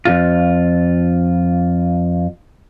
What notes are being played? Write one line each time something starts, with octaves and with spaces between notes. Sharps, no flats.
F2 A#2 F4